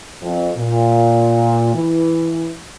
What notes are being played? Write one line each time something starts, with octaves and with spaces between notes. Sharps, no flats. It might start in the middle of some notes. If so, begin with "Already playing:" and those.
F2
A#2
E3